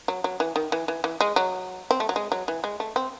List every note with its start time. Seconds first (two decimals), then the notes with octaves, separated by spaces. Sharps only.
0.08 F#3
0.24 F#3
0.40 E3
0.56 D#3
0.72 E3
0.88 E3
1.04 E3
1.21 G#3
1.36 F#3
1.91 C4
2.00 A3
2.09 F#3
2.16 G#3
2.32 F#3
2.48 E3
2.64 G#3
2.80 A3
2.96 C4